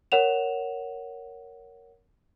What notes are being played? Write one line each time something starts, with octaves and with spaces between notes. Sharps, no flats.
A#4 C#5 F#5 E7 F7